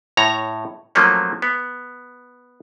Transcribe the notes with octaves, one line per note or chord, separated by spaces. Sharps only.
A2 C#5 A#5
F3 F#3 A3 A#3 C#4
B3